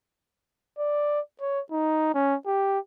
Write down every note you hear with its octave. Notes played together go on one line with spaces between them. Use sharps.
D5
C#5
D#4
C#4
G4